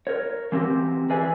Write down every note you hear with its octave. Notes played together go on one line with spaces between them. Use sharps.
A#4 C#5
E3 C4 F#4 G4
E3 G#4 B4 D5 E5 G#5